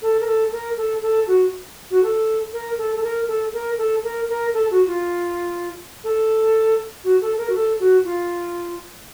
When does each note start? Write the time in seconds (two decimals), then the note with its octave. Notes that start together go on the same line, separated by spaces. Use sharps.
0.02 A4
0.21 A#4
0.27 A4
0.52 A#4
0.77 A4
1.02 A4
1.27 F#4
1.91 F#4
2.03 A4
2.53 A#4
2.78 A4
2.96 A4
3.04 A#4
3.28 A4
3.53 A#4
3.78 A4
4.03 A#4
4.29 A#4
4.54 A4
4.71 F#4
4.87 F4
6.04 A4
7.04 F#4
7.21 A4
7.38 A#4
7.50 F#4
7.55 A4
7.80 F#4
8.05 F4